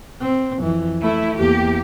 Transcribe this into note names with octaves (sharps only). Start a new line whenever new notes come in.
C4
F2 E3
A3 E4
E2 A#3 G4